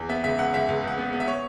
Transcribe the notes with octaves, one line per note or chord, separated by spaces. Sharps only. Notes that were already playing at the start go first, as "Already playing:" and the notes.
Already playing: E2
B3 E5
C#2 E5
C#2 F#5
C#2 E5
C#2
C#2 F#5
B3
B3
E5
C#5